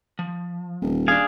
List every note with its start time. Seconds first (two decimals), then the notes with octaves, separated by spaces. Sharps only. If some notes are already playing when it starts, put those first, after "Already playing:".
0.19 F3
0.81 D#1
1.08 D4 G#4 F5